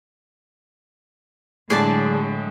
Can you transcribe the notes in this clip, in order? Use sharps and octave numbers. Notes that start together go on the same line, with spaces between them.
A2 D3 F#3 G#3 G#4 D5 A5